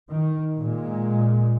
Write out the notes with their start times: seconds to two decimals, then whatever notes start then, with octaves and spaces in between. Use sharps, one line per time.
0.11 D#3
0.57 A#2 G#3